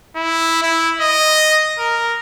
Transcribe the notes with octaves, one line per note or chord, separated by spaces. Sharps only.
E4
E4
D#5
A#4